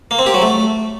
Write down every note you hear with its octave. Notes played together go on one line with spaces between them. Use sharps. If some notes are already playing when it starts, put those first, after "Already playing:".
A#3
C4
G4
F#3
A3